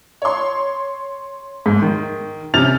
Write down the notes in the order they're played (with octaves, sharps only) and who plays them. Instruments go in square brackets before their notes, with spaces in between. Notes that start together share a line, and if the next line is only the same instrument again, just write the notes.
[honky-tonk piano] C#5 C6
[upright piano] G#2
D#3
[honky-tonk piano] C3 C#4 [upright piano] F6 A6 F7